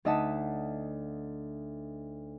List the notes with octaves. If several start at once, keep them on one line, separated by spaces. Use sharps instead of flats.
D2 D#4 D#5 E5 F#5 A5